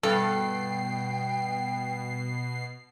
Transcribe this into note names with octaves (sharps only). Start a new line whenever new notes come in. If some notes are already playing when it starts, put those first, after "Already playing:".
G2 B2 A4 G5 C7